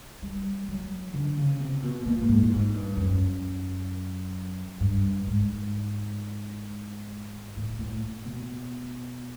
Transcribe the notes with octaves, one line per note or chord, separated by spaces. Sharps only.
G3
F#3
D3
C#3
C3
B2
A#2
G2
G#2
A2
G#2
G2
F#2
G2
G#2
A2
A2
B2